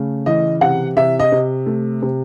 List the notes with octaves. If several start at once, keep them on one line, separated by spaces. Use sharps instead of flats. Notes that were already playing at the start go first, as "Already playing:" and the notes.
Already playing: C#3 A3
E3 D#5
C3 F#5
C3 E5
D#5
C3
A3
C3